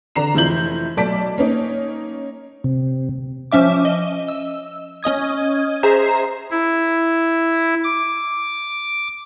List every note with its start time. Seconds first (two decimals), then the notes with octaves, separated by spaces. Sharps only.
0.15 D3 D4 A#5 C7 E7
0.34 F1 E3 F3 E4 G6 F#7
0.97 B1 A3 D5 A5 B6 D7
1.38 A#3 C#4 D#4
2.64 C3
3.52 F3 C#4 E5 D6
3.85 D#5
4.28 E6
5.03 C#4 D#5 D#6 G#6
5.83 G#4 C5 E5 A#5
6.51 E4
7.84 D6